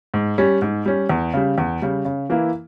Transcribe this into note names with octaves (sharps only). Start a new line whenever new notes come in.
G#2
G3 C#4
G#2
G3 C#4
E2
C#3 G3
E2
C#3 G3
C#3
E3 A#3 E4